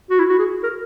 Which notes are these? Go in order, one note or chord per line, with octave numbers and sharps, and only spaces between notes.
F#4
E4
F#4
G#4
A#4